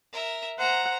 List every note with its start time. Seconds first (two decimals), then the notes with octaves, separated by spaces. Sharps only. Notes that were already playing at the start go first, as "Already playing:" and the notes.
0.13 A#4 E5
0.58 C5 F#5 A#5